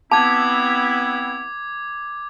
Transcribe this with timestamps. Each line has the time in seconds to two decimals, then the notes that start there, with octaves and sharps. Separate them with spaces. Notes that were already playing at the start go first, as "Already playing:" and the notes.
0.12 B3 C4 E4 A5 D6 G#6